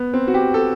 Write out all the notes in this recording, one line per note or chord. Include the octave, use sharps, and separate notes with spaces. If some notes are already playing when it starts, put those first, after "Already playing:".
Already playing: B3
C4
F#4
G4
A4